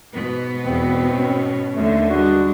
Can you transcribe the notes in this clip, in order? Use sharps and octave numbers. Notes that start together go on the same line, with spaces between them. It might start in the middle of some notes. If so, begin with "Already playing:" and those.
G#2 B2 B3
E2 C4
C#4
D#2 D3 A3
G3 G#3 D4 F#4